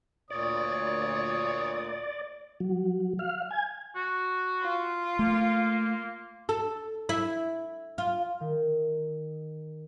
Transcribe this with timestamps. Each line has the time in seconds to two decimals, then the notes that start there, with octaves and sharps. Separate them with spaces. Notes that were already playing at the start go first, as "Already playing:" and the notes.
0.31 D2 A#2 C#5 D5 D#6
2.60 F#3
3.19 F5
3.51 G#5
3.95 F#4
4.62 F4
5.19 A3 A#3
6.49 A4
7.09 E4
7.98 F4
8.40 D#3